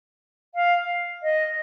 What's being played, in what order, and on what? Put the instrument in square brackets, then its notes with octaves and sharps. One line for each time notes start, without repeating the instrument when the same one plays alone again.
[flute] F5
D#5